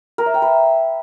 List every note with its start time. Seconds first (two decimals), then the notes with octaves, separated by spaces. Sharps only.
0.18 A#4
0.26 E5
0.34 G5
0.42 B4